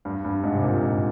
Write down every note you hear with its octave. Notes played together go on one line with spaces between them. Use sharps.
G2
G2
G#2
C3
A#2
G#2